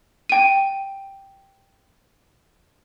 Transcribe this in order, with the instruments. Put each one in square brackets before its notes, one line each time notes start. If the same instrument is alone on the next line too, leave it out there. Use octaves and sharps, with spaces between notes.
[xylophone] G5 D#7